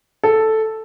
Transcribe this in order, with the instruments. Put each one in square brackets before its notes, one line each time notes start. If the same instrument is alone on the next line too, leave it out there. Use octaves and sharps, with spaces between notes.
[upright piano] A4